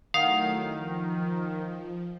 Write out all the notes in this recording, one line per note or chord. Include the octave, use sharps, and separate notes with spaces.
D#3 F#3 A3 E4 F5 F#5 D#6
F3